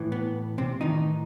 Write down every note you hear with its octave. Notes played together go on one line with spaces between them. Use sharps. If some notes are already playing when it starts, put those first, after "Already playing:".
Already playing: A2 E3
B3
C3 C4
A2 D#3 E3 D#4